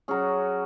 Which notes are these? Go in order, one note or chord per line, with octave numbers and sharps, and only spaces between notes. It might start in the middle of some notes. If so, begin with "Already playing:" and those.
F#3 C#4 G#4